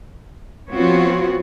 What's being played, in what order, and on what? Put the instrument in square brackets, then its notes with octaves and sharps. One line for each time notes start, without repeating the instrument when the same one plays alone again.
[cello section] F3 B3 C4 F4 F#4 C#5